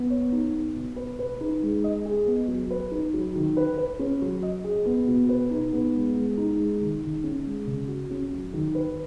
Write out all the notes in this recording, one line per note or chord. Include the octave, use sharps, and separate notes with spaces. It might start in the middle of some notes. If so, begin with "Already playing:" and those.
Already playing: B3
C#5
D#4
B3
B2
B4
B4
D#4
G#3
D#5
G#4
B3
F#3
B4
D#4
F#3
D#3
B4
B4
C#4
F#3
D#5
G#4
B3
B2
B4
D#4
B3
G#3
G#3
D#4
G#3
D#3
D#3
C#4
G#3
C#3
F#4
C#4
F#3
D#3
B4